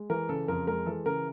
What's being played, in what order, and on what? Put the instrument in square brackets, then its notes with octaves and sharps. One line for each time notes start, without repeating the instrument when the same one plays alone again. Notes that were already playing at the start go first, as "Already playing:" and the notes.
Already playing: [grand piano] G#3
E3 A#4
C#3 A4
F2 A#4
G#3 A#4
E3 A4
C#3 A#4